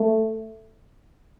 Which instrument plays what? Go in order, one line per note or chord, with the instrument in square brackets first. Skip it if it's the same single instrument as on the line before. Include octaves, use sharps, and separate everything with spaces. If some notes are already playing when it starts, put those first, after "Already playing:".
Already playing: [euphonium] A3